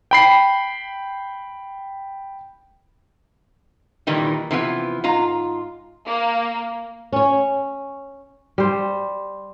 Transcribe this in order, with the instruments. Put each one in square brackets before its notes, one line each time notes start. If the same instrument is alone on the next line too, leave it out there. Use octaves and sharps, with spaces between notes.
[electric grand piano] G5 B5 C7
[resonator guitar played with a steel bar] A#2 D#3 E3 G3
C3 E3 F3 B3
G#2 F4 A#5
[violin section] A#3
[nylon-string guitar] C#4 C#5
[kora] G3 C5